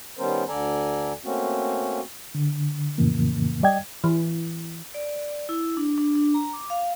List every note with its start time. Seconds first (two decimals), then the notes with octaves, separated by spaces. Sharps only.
0.18 D#3 G3 B3 C#4 A#4 C5
0.48 D2 D3 A4 D5 G#5 A#5
1.24 A3 A#3 C4 C#4 F#4
2.35 D3
2.98 F2 A2 C#3 E3 A#3
3.63 G3 D5 D#5 G5 G#6
4.04 E3
4.94 D5
5.49 E4
5.77 D4
5.98 D4
6.15 D4
6.34 A#5
6.53 D6
6.70 F5